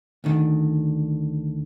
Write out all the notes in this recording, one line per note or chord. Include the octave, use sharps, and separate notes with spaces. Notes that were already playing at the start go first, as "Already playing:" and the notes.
D2 D3 D#3